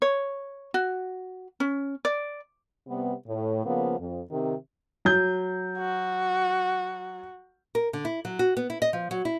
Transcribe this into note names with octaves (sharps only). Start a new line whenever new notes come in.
C#5
F#4
C#4
D5
C3 G3 B3
A2
C#3 F3 A#3 B3
F2
C3 D#3
F#3 G6
F#4
A#4
D3
E4
F#3
F#4
B3
E4
D#5
F3
F#3
E4